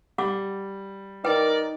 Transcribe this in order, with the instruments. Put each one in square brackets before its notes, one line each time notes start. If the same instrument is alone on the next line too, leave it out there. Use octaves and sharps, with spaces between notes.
[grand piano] G3 [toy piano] F#5 D6
[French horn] D#4 [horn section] A#4 D5 [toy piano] B4 G5